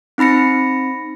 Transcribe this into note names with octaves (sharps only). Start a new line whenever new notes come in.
C4 D#4 B5 A#6 C#7